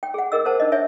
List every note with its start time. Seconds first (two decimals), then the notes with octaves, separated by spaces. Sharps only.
0.03 G5
0.14 G#4 F#5
0.32 G#4 A#4 D#5 E6
0.45 A#4 C5 F#5 A5
0.60 D4 D#5
0.72 C#5 E5 G#5